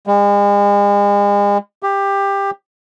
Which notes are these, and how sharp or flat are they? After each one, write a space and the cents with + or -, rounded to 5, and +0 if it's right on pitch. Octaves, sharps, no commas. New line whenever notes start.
G#3 -40
G4 +15